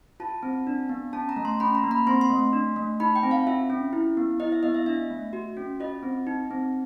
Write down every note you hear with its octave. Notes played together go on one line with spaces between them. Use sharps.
F4 A5
C4
D4
B3
C#4 A5
A#5
A3
C6
C#4 B5
A#5
A#3
B5
C4 C6
C6
A3
D4
A3
D#4 B5
G5
C4
F5
F4 E5
C#4
E4
B3
E4 D#5
E5
B3 D#5
E5
D4 E5
A3
F#4
C#4
F4 D#5
C4
D#4
C4